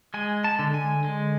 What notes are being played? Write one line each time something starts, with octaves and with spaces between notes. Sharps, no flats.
G#3 G#5
A5
D3
G#5
G#3